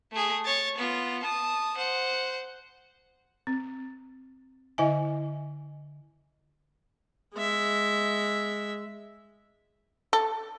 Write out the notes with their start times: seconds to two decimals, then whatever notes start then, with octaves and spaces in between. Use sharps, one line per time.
0.12 A3 G#4
0.45 C#5 A6
0.78 B3 F4
1.23 A5 D#6
1.77 C5 F#5
3.47 C4
4.78 D3 E4 D#5 E5 G#5
7.34 G#3 E5
10.13 A4